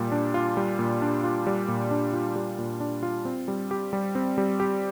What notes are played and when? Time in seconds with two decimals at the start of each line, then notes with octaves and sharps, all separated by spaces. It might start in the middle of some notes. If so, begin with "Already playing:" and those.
Already playing: A#2 G3
0.12 D4
0.34 F4
0.57 G3
0.79 A#2
1.02 D4
1.24 F4
1.47 G3
1.68 A#2
1.91 D4
2.13 F4
2.36 G3
2.58 A#2
2.80 D4
3.03 F4
3.25 C4
3.48 G3
3.71 G4
3.93 G3
4.15 C4
4.38 G3
4.60 G4